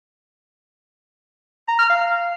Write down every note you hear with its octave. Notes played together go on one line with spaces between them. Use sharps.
A#5
F6
F5